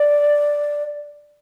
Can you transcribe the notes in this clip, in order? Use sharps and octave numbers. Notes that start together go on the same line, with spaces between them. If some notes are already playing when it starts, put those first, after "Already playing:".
Already playing: D5